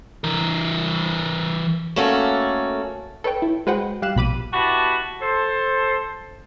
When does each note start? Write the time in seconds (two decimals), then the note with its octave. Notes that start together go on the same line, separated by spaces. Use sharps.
0.24 E3 A#4
1.96 A3 A#3 C#4 F#4 A4
3.24 A4 B4 C#5 G5
3.42 E4
3.67 G#3 F#4 B4 C5 F#5 G5
4.02 G3 F5 F#6 E7
4.16 A#1 B2 B5 D6 D#7
4.53 B2 E4 F#4 G4 A5 B5
5.22 A4 C5